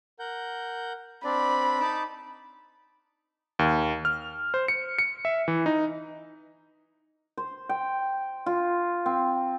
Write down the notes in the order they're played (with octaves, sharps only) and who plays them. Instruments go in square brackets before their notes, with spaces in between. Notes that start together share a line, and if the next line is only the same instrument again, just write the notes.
[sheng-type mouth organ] A#4 F#5 G6
[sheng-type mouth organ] C4 D4 D5 [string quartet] B5
[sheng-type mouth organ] D#4 A5 D6
[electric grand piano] D#2
F6
C5
C#7
C#7
E5
E3
D#4
[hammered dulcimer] C5
G5
F4
C4